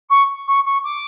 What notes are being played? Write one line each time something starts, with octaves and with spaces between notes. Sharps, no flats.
C#6
C#6
C#6
D6